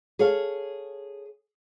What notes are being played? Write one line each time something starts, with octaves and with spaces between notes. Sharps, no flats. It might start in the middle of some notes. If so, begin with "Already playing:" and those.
G#4 A4 C#5 F5